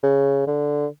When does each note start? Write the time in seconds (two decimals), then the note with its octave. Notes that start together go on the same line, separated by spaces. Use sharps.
0.03 C#3
0.47 D3